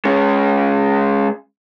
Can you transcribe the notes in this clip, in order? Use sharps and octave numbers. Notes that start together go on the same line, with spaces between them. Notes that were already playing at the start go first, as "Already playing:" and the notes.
G#3 C#4